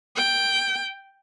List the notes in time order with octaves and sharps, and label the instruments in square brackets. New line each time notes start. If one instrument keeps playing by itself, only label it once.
[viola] G5